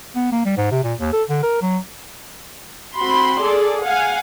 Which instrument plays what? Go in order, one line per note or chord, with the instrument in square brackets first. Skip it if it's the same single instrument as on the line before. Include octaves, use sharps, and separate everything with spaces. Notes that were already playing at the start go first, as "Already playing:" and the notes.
[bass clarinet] B3
A#3
G3
G#2
C3
A#2
D#2
A4
D3
A#4
F#3
[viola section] C4 F#4 B5 C6
G#4 A4 D5
F5 F#5 G#5